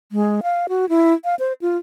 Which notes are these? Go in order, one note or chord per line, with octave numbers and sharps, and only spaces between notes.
G#3
F5
F#4
E4
F5
C5
F4